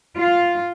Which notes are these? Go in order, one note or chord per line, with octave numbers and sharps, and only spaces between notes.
F4